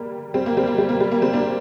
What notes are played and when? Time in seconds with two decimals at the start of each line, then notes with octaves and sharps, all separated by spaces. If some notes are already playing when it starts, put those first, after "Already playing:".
Already playing: G3 A#3
0.34 G3 C4
0.46 A#3
0.57 G3 C4
0.67 A#3
0.78 G3
0.89 A#3
1.00 G3
1.11 A#3
1.22 G3 C4
1.33 A#3 D4